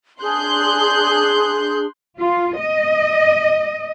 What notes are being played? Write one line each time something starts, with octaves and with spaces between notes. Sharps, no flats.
D4 G#4 C6 F#6 G6
F4
D#5